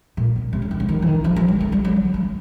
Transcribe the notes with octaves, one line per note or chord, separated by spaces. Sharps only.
A#2
B2
C3
C#3
D#3
C#3
D#3
E3
D#3
F3
F3
G3
A3
G3
F#3
F#3
G3
G#3
A3